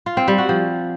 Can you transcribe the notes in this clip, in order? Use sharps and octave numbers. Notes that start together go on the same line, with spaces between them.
F4
C4
G3
F#4
F3